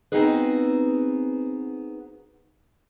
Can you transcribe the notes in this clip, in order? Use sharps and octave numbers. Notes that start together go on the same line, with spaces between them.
B3 C4 D#4 F#4 G#4 B4